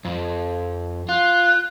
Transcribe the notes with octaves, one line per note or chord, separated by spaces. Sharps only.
F2
F4 F#6